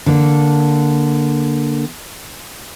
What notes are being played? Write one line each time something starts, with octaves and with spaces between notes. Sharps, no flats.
D3 A#3